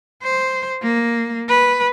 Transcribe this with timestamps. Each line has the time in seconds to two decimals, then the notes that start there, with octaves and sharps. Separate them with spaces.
0.23 C5
0.82 A#3
1.48 B4